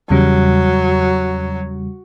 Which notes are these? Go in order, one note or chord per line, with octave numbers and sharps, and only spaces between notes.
E2 C#3 F#3 G3